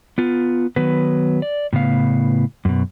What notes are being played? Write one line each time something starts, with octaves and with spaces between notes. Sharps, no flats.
B3 F4
D#3 F#3 B3 B4
D5
A2 C#3 B3 F5
F#2 B2